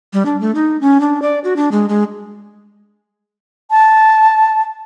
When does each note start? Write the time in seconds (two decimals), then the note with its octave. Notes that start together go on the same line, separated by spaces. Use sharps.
0.13 G3
0.26 D4
0.41 A3
0.55 D#4
0.81 C#4
1.01 D4
1.22 D5
1.44 F#4
1.56 D4
1.72 G#3
1.89 G#3
3.71 A5